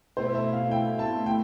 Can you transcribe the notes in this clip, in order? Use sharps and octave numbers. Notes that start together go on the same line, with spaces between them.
B2 A3 E4 C5
E5
F5
G5
A5
G5